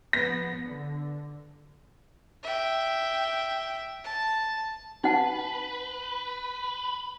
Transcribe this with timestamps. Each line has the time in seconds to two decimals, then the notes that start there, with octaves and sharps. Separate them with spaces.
0.13 F3 B3 A#6
0.65 D3
2.43 E5 G5
4.04 A5
5.04 D#4 B4 F#5 A5